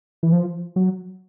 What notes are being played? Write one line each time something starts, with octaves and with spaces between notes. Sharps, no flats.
E3
F3
F#3